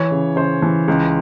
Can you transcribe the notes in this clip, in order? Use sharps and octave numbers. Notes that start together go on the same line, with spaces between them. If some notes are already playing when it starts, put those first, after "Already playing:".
Already playing: E3 C#5
C#3
C#3 C5
E3
C#2